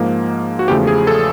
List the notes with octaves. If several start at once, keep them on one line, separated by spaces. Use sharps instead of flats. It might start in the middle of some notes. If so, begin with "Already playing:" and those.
Already playing: G#2 F3 A#3
F#4
E2 C#3 F3 A3 G4
G#4
A4